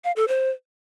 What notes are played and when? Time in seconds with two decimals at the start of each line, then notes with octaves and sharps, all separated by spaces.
0.04 F5
0.16 A4
0.28 C5